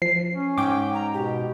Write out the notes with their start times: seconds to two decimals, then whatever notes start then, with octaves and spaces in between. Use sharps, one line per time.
0.02 F3 C7
0.32 C#4
0.58 G#2 G5 D6
0.94 A#5
1.13 B2 G4